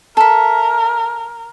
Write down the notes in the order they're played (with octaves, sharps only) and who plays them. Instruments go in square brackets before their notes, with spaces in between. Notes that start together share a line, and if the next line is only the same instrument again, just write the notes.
[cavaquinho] A4 E5 [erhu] A#4